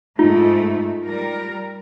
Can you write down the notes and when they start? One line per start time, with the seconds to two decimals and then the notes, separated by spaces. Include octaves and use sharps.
0.19 G#2 A3 D#4 F4
1.04 G3 A#4